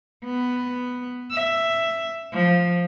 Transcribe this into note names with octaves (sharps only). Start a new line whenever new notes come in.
B3
E5
F3